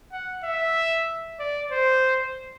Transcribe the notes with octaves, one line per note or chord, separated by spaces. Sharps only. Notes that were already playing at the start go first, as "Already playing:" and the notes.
F#5
E5
D5
C5